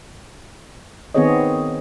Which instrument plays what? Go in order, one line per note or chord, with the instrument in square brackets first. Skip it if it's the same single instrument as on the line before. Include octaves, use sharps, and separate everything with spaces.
[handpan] D#3 B3 C4 G#4 C#5 D#5